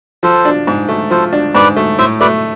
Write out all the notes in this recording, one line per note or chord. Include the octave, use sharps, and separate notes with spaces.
F3 A4 C5
D4
G#2
A3
F3 A4 C5
D4
G#2 B4 D5
A3
A2 C5 E5
A3 B4 D5